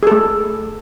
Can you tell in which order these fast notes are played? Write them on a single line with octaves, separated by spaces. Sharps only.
G#4 A4 A3